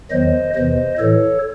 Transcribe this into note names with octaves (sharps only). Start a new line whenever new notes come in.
E2 D#3 F#3 C5 D#5
E2 C3 E3 C5 D#5
A2 E3 A4 C#5